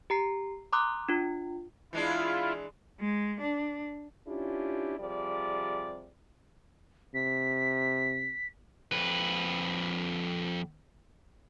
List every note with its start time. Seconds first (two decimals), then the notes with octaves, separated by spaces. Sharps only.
0.10 G4 A#5 C7
0.73 A#5 C6 D6 D#6 F#6
1.09 D4 F4
1.93 E3 G#3 D4 E4 F4
2.99 G#3
3.41 D4
4.28 C#4 D4 E4 F4 G4
5.00 C3 F3 G3 G#4 D5
7.14 C3 B6
8.92 F2 B4